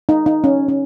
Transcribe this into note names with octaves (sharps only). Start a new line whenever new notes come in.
D#4
D#4
C#4
C#4